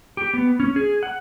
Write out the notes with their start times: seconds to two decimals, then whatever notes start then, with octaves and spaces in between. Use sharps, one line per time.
0.17 G4
0.34 B3
0.60 C#4
0.76 G#4
1.03 F#5